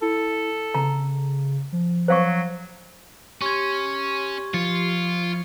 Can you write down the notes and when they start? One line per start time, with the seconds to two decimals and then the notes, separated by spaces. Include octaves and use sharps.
0.02 E4 A4
0.74 C#3 A#5
1.73 F3
2.08 F#3 C5 F5 C#6
3.42 C#4 G4 C6 C#6 G#6
4.54 F3 F4 C#7